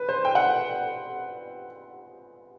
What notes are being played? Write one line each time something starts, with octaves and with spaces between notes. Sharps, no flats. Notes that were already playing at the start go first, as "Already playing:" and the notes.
Already playing: B4
C5
G5
F#5